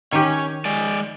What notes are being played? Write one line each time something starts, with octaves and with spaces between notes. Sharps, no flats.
D#3 C#4 G4
G#3 D5